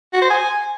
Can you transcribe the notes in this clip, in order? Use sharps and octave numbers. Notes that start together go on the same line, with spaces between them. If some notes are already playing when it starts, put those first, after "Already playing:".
F#4
C5
G#5